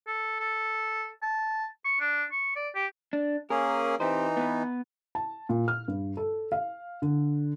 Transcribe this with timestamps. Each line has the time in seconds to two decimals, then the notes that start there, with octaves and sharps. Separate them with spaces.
0.07 A4
0.40 A4
1.22 A5
1.85 C#6
2.00 D4
2.32 C#6
2.56 D5
2.75 G4
3.13 D4
3.50 A#3 C#4 G#4 A#4
4.00 E3 C4 D#4 G4 C5
4.37 B3 B4
5.15 A5
5.49 A#2
5.68 F6
5.88 G2
6.17 A4
6.52 F5
7.02 D3